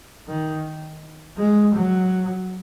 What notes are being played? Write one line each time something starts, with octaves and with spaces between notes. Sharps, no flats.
D#3
G#3
F#3